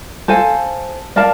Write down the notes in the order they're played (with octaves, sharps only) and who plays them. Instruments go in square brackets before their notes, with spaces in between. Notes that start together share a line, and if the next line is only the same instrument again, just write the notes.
[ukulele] A4 C5 F5 G#5
A#4 D5 F5 A5